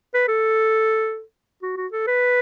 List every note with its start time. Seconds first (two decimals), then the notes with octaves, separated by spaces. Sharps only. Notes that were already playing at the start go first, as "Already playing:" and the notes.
0.14 B4
0.28 A4
1.62 F#4
1.77 F#4
1.92 A4
2.07 B4